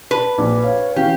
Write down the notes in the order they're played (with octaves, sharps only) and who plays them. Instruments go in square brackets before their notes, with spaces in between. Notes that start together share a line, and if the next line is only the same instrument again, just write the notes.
[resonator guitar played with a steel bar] B4 [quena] A5
[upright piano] A#1 [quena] D6
[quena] C#5 [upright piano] F5
[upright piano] E3 C#4 [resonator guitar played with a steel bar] G4 [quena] F5